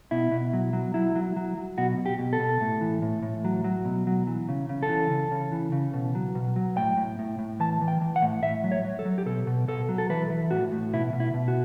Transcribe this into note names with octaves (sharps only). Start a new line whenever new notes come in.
B2 E4
B2
F#3
F#3
F#3 E4
F#3
F#3
F#3
B2 F#4
B2
G4
B2
A4
B2
A2
E3
A2
A2
F#3
F#3
B2
F#3
E3
C#3
C#3
A4
E3
C#3
C#3
E3
C#3
B2
F#3
B2
F#3
A2 G5
A2
A2
A2
E3 A5
E3
G5
E3
F#5
A2
A2 E5
F#3
C#5
F#3
A4
F#3
G4
B2 A4
B2
B2 A4
F#3
A4
E3 B4
E3
A2 F#4
A2
B2 E4
B2
E4
B2
F#4